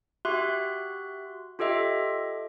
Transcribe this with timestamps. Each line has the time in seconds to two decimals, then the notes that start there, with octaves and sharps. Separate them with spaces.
0.25 F#4 G4 E5 C6 F#6
1.59 F4 G4 A4 D#5 E5